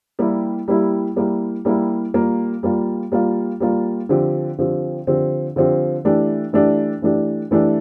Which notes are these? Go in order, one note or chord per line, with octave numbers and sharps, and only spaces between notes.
G3 A#3 E4 G4
G3 A#3 E4 G4
G3 A#3 E4 G4
G3 A#3 E4 G4
G3 A#3 F4
G3 A#3 F4
G3 A#3 F4
G3 A#3 F4
D3 F3 C4 G4
D3 F3 C4 G4
D3 F3 C4 G4
D3 F3 C4 G4
E3 A3 D4 G4
E3 A3 D4 G4
E3 A3 D4 G4
E3 A3 D4 G4